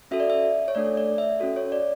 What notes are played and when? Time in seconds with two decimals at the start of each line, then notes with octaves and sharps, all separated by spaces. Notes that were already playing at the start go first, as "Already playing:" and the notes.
0.11 C#4 F#4 A4 E5
0.20 D5
0.30 E5
0.68 C#5
0.75 A3 D4 A4 D5
0.97 D5
1.18 E5
1.40 C#4 F#4 A4
1.56 C#5
1.72 D5